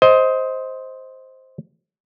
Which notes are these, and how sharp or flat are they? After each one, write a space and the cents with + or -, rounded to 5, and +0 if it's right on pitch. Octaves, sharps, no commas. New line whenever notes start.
C5 +0 D#5 +20